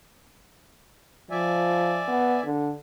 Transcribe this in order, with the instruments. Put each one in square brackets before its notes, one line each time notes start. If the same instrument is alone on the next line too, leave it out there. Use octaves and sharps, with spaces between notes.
[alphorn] F3 [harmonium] D5 E5 G#5
[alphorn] B3
D3